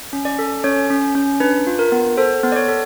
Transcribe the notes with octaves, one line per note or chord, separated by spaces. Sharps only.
C#4
D5
A4
C#4 C#5
C#4
C#4
D4 B4
F4
A#4
B3
A4 C5
B3
D5
C#5
A4